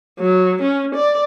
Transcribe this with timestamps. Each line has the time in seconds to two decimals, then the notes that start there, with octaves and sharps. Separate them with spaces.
0.19 F#3
0.62 C#4
0.95 D5